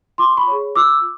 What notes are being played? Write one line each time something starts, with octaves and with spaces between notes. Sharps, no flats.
F4 C6 D6
B5 C#6
G#4 C#5
F4 D6 E6